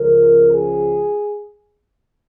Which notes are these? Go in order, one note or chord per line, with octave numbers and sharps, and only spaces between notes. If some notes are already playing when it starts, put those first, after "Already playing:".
Already playing: C#2 C#3 F3 A#4
G#4